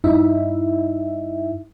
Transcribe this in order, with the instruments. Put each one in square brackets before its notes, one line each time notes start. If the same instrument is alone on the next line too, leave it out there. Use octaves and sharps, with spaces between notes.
[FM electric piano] G2 D#4 E4 E5